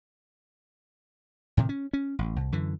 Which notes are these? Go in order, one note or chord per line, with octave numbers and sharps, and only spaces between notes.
A2 C3 D#3
C#4
C#4
A1
C2
F#2 D3 E3